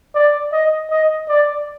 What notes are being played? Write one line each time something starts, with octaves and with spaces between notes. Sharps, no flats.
D5
D#5
D#5
D5